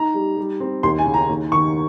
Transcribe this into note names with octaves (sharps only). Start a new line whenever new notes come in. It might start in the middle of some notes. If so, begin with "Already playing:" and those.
Already playing: D#4 A#5
G3
G3
C4
D#2 C6
G#5
C#3
A#5
D#2
D#3 C#6